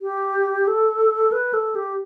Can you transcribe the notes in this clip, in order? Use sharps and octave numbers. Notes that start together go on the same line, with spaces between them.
G4
A4
B4
A4
G4